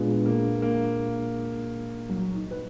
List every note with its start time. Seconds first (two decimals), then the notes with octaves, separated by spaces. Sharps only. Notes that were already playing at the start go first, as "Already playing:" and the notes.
Already playing: A#2 G#3 B3 D4 F4 G#4
0.26 A#3
0.62 A#3
2.09 F#3
2.34 D#4
2.51 B4